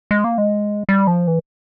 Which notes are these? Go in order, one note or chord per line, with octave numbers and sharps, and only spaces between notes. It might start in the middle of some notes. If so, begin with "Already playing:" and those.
G#3
A#3
G#3
G3
F3
E3